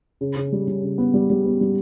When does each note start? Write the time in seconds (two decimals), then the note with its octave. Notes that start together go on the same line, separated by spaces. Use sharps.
0.21 C#3
0.37 C#3
0.52 G3
0.68 G3
0.83 C#3
0.98 B3
1.14 G3
1.30 G3
1.46 B3
1.61 G3